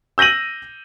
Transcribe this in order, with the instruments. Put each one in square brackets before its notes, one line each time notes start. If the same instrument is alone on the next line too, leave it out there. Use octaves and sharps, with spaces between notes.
[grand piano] E6 G6 A#6 D#7 F#7